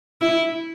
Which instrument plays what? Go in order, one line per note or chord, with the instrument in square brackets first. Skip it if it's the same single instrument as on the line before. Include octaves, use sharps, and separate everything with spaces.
[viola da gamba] E4